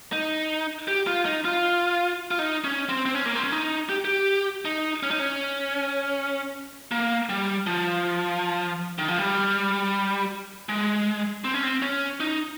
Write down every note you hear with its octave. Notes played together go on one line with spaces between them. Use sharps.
D#4
G4
F4
D#4
F4
F4
D#4
C#4
C4
C4
C#4
A#3
C4
C#4
D#4
G4
G4
D#4
C#4
D#4
C#4
A#3
G3
F3
D#3
F3
G3
G#3
C4
C#4
C4
C#4
D#4